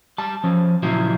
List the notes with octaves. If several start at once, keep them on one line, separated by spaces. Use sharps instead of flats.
G3 A5
F3 C#4
A#2 C#3 F3 F#3 E4